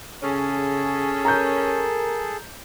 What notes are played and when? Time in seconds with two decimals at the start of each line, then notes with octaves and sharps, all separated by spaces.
0.23 C#3 C#4 G#4 A4
1.25 A#4 A#5 G6